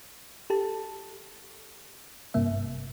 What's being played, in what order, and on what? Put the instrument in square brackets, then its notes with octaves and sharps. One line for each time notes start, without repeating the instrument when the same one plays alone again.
[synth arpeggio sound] G4 A4 A5
G#1 G2 C3 A#3 E5